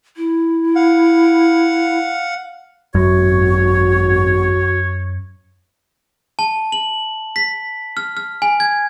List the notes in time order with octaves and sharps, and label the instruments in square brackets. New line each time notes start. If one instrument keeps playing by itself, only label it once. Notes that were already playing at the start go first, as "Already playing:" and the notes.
[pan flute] E4
[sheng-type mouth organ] F5 F#5
[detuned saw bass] G#1 [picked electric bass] F#2 [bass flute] F#4 [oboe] C#5
[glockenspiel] A5
F#7
B6
F6
F6
G#5
G#6